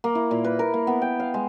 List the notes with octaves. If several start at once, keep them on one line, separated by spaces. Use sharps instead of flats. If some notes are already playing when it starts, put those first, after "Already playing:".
A#3
E4
A#2
B4
A#4
A#3
B3
G5
F5
G#3